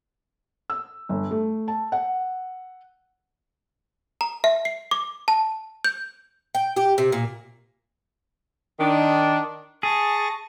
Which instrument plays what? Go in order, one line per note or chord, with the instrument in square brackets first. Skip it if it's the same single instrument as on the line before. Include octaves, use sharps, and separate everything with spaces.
[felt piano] E6
G1
A3
A5
F#5
[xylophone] A#5
E5
C7
D6
A5
G6
[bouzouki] G5
G4
C3
A#2
[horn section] D#3 D4
[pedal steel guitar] G#4 [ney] A5 [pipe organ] C#6 A6 A#6